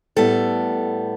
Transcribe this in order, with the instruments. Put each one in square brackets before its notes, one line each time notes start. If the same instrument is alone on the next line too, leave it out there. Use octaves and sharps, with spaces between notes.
[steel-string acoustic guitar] A2 G3 B3 A4